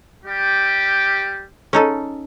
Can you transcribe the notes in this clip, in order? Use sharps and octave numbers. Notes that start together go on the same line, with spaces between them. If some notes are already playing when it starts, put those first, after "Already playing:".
G3 G4
C#4 D#4 A4